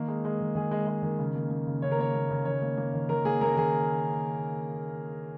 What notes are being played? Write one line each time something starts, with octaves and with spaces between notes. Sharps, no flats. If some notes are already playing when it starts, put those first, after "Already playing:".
Already playing: D#3 A#3
G#3
G#3
D#3
D#3 G#4
G#3
G#3
D#3
C#3
A#3
A#3
C#3
C#3 C#5
A#4
A#3 C#5
A#3
C#3
D#3 C#5
A#3
A#3
D#3
D#3 A#4
A#3 G#4
A#3 A#4
D#3 G#4